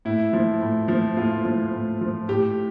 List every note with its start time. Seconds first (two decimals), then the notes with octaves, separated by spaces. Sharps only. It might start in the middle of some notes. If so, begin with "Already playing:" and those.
0.05 A2 E4
0.33 F3
0.61 A2
0.88 F3
1.17 A2 F4
1.45 F3
1.72 A2
2.01 F3
2.28 A2 G4